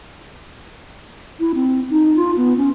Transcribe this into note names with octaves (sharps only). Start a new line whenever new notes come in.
E4
C4
D#4
F4
B3
C#4